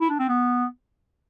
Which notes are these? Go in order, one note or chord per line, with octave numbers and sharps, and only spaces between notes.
E4
D4
C4
B3